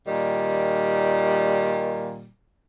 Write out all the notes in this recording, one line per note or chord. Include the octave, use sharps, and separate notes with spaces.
A#2 D#3 G3